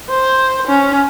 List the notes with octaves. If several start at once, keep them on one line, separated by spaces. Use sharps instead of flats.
C5
C#4